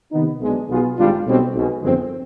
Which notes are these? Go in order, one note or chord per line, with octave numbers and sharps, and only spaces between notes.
C3 D#3 B3 D#4
B1 B2 G#3 D4
B1 B2 B3 F4 G#4
G#1 G#2 G3 D4 F4
B1 B2 G3 C4
B1 B2 G#3
G1 F2 D#3 G#3 C4